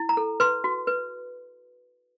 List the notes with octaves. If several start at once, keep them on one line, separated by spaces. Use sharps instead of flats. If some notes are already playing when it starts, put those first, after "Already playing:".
Already playing: E4
A#5
A4
B4 C6
F#4
B4